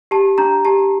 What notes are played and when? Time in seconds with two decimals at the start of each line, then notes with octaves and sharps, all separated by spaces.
0.11 G4 A5
0.38 D4 A#5
0.65 G4 A5